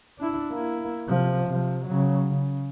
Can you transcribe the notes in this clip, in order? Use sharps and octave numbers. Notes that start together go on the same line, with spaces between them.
D4 E4
A#3 E4
C3 F3
C3 F3
C#3 F#3
C#3